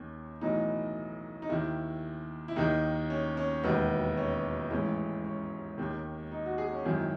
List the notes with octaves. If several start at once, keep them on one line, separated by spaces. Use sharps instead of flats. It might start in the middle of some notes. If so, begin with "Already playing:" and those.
Already playing: D#2 D#3 C#4
B1 A2 E3 D#4
D#4
D#2 D#3 E4
E4
D#2 D#3 D#4
C#4
C#4
E1 D#2 D#3 B3
C#4
A1 G#2 E3 C#4
C#4
D#2 D#3
D#4
F#4
G#4
C#4
G#1 F#2 D#3 E4